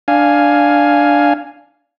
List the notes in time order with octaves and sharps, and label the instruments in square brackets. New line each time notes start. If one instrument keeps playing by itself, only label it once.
[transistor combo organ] D4 F5 G#5